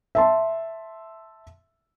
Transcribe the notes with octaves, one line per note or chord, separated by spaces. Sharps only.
E5 A5 C6